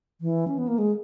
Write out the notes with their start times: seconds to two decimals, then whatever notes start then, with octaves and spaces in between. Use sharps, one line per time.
0.21 E3
0.48 C#4
0.58 B3
0.68 A#3
0.78 G#3